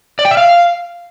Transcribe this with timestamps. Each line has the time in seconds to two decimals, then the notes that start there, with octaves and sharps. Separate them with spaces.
0.19 D5
0.25 G5
0.31 E5
0.37 F5